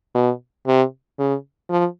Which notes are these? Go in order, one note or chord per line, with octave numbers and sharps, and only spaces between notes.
B2
C3
C#3
F3